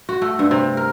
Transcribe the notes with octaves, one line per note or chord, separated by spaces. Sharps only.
F#4
A3
G2
C3
A#4